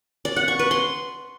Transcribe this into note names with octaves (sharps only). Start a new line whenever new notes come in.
D5
F#5
C#6
B4
C6